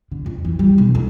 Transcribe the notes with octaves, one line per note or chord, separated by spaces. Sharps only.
D3
F2
E3
G3
B1
F2